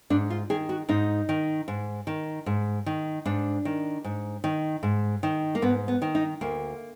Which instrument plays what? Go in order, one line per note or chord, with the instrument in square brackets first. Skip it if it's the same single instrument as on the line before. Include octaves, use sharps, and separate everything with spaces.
[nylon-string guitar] G#2 D4
F4
D#3 G#4
F#4
G#2 D#4
D#3
G#2
D#3
G#2
D#3
G#2 D4
D#3
G#2
D#3
G#2
D#3
A#3
G#2 B3
B3
D#3
D#4
D2 A#3